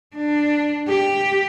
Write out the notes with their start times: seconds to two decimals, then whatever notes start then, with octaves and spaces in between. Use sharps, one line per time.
0.16 D4
0.88 G4